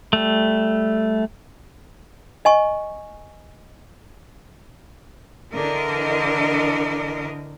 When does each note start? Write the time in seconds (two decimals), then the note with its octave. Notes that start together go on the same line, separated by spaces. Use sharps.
0.13 G3 A3
2.45 D#5 G#5 C#6
5.54 D3 E3 D4 A#4 D#5